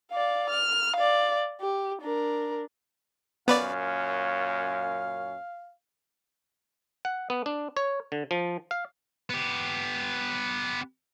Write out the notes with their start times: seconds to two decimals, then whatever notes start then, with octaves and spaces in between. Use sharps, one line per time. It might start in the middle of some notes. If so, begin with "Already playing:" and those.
0.11 D5 F5
0.50 F6
0.96 D5 F5
1.61 G4
2.02 D4 A#4
3.48 F#2 A#2 B3 C#4 B4 D5 F5
7.05 F#5
7.30 B3
7.46 D4
7.77 C#5
8.12 D3
8.31 F3
8.71 F5
9.30 B3 G4